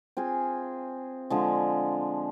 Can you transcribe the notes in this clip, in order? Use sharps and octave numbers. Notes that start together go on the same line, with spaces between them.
C4 F4 G#4
D3 F3 G#3